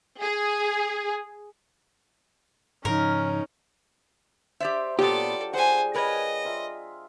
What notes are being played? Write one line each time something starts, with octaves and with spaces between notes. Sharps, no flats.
G#4
G#2 C#3 F3 C#4 D#4 A#4
G4 C5 D5 E5
A#2 F#3 B3 D4 F4 G4 A4 D5
G3 G#4 C5 F#5 G#5
A#4 B4 C#5 D#5
F4 E5 A#5